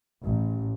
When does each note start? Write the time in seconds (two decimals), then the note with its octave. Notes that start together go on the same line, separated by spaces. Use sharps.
0.22 A1